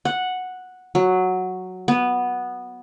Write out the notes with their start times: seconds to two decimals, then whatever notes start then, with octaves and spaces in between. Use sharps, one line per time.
0.05 F#5
0.95 F#3
1.88 B3